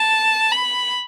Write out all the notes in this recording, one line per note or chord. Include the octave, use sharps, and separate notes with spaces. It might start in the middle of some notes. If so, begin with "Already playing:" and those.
Already playing: A5
B5